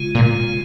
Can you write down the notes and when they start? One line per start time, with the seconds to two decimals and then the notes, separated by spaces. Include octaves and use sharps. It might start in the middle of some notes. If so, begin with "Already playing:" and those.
Already playing: C#3 G#3 F4
0.15 A#2